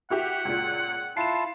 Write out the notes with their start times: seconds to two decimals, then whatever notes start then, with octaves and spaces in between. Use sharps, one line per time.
0.10 E4 F#4 G4 F#5
0.45 C#2 A#2
1.17 E4 F4 A5 C7 E7